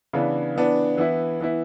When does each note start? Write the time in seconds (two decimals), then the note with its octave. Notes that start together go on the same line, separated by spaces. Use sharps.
0.13 C#3 E3 B3 D4
0.56 E3 B3 D4
0.98 E3 B3 E4
1.41 E3 B3 E4